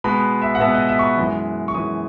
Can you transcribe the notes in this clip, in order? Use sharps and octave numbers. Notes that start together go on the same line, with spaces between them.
B2 G#3 B3 B5
E5
F#5
B2 G#3 B3 E5
D#5
E5
C#6
B5
F#2 E3 G#3
C#6
F#2 E3 G#3 D#6